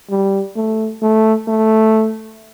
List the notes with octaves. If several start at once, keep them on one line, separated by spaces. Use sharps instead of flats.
G3
A3
A3
A3